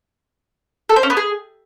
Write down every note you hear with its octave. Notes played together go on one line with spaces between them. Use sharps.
A4
C5
C#4
B3
G#4